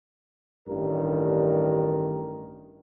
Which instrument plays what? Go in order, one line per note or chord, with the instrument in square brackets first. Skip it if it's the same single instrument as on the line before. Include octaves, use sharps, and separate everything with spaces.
[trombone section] A1 G2 D#3 A#4